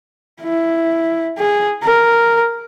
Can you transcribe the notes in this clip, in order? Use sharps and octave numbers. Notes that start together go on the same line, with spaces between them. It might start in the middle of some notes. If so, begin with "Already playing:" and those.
E4
G#4
A#4